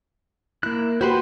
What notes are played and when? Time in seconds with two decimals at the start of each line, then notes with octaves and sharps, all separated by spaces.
0.63 A#3 E4 F#6
1.01 F#4 G4 B4 C5 B5 C6